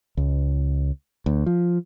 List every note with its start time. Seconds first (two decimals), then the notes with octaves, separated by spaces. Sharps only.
0.17 C#2
1.26 D2
1.46 F3